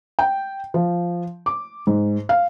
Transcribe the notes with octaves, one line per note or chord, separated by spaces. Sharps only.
G5
F3
D6
G#2
F5